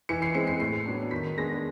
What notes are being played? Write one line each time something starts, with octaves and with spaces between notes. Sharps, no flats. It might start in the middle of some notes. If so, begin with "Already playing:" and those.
E3 C#7
C7
G#3 C4 C#7
C7
A2 C7
F#3 B3 D4
D#3 B6
G#3 B3 D4 A#6